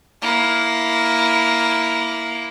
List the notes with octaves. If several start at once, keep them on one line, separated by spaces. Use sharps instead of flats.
A#3 E4